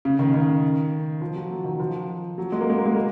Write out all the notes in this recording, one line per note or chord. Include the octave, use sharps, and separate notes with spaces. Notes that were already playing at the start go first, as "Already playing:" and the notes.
C#3
D#3
D#3
F3
F#3
F#3
D#3
F3
F#3
G#3
A#3
G#3
A#3
G#3
A#3